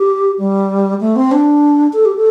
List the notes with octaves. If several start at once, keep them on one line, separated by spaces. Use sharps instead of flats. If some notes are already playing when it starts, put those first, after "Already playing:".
Already playing: G4
G3
A3
C4
D4
A4
G4
A4